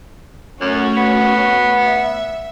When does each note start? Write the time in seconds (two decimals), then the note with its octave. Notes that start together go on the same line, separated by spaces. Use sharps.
0.61 F#2 A3 C#4 F#4
0.97 B3
1.82 E5